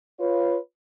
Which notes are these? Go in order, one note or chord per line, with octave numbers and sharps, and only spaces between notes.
F4 B4 C#5